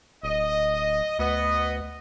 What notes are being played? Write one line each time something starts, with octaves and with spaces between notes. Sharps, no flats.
D1 D#5
D2 B3 D#5